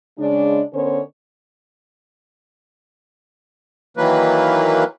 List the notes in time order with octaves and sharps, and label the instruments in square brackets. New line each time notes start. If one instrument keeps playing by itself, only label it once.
[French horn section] C#3 G#3 D4
D3 B3 C#4 A#4 C5 C#5
[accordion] D#3 E3 F#3 A#3 B4